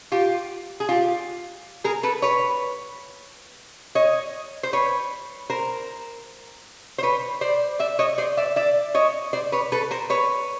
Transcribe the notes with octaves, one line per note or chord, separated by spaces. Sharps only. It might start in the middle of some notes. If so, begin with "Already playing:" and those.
F4 G4
G#4
F4 G4
G#4 A#4
A4 B4
B4 C#5
C#5 D#5
C5
B4 C#5
A#4 C5
C5
B4 C#5
C5 D5
D5 E5
C#5 D#5
C5 D5
D5 E5
D5 E5
C#5 D#5
C5 D5
B4 C#5
A4 B4
A#4 C5
B4 C#5